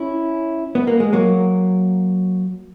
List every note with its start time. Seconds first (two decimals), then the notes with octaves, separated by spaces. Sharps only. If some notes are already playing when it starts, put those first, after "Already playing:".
Already playing: C#4 E4
0.75 B3
0.87 A#3
1.00 G#3
1.13 F#3 A#3